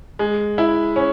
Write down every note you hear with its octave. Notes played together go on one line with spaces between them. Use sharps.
G#3
E4
C#4